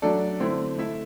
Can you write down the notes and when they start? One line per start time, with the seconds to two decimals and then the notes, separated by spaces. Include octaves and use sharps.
0.02 F#3 A3 D4 A4 D5
0.40 D3 A3 C4 E4
0.77 A3 E4 A4 E5